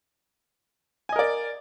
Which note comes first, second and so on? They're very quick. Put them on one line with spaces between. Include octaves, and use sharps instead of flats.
G#5 D#5 A#4 D5